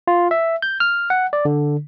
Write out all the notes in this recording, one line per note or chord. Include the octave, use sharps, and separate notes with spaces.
F4
E5
G6
F6
F#5
D5
D3